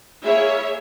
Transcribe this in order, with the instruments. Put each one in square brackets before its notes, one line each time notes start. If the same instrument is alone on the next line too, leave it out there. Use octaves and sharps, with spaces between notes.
[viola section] A#3 E4 G#4 C#5 E5